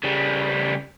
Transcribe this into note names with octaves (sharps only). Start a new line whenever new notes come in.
C#3 G3